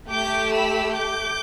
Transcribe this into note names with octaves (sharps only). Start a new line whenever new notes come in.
A3 G4 D6 G6
B5 E6
D6 G6